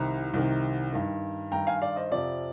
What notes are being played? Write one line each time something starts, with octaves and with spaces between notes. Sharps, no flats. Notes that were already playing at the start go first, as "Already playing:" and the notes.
Already playing: C2 C3 D#3 A#5
C2 C3 D#3
G2 D#3
G2 D#3 G5 A#5
F5 G#5
D5 F5
C5 D#5
F2 C3 F3 D5